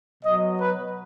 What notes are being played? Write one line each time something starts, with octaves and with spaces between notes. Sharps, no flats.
B2 F#3 D#5
B4